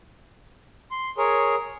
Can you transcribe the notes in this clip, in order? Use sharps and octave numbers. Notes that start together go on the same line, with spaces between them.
C6
G#4 A#4 C#5